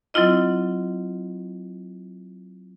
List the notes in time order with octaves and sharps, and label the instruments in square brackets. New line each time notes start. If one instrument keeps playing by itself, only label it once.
[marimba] F#3 C4 E4 F4 D#5